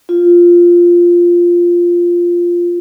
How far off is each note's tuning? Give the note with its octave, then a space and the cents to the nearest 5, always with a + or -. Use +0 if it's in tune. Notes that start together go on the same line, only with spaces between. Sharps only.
F4 -5